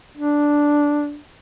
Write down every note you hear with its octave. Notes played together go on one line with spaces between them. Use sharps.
D4